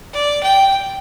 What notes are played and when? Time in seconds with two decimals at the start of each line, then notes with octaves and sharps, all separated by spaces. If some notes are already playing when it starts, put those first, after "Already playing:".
0.13 D5
0.43 G5